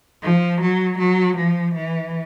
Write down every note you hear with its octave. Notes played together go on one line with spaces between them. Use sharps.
F3
F#3
F#3
F3
E3